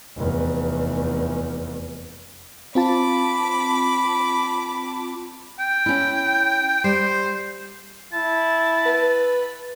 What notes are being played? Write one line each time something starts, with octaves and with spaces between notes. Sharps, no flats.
F1 E2
C4 F4 A5 B5 D6
G5
C#4 E4
G3 C5
E4 A5
B4